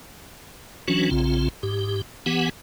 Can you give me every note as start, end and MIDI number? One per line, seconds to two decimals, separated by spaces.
0.88 1.10 52
0.88 1.10 54
0.88 1.10 61
0.88 1.10 62
0.88 1.10 66
1.11 1.48 34
1.11 1.48 49
1.11 1.48 60
1.11 1.48 65
1.63 2.01 44
1.63 2.01 67
2.26 2.49 52
2.26 2.49 59
2.26 2.49 67
2.26 2.49 78
2.26 2.49 80